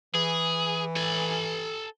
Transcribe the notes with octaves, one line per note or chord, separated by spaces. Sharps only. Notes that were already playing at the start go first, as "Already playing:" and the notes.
E3 G#4
A4 G#5